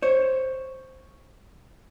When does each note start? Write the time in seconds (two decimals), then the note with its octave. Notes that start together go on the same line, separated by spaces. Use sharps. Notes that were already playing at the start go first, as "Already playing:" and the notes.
0.02 C5 C#5